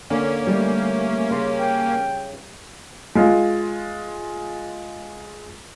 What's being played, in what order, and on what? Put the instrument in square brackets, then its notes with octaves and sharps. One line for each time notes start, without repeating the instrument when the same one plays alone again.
[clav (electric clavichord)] D3 [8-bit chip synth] A#3 C#4 [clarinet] C#5
[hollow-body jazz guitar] G3 [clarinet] A3
[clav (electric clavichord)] C#3 [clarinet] C6
[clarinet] G5
[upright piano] G#3 F4